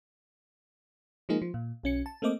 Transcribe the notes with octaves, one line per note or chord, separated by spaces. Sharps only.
F3 G#3 A#3 D#4 G#4
F3
A#2
B1 C#4 C#7
A5
A3 A#3 C4 D#5 D6